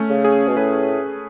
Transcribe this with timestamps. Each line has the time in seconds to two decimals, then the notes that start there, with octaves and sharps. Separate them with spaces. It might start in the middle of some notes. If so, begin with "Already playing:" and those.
Already playing: A3 C#4
0.09 C#3
0.25 G#4
0.47 B2
0.57 A2 B4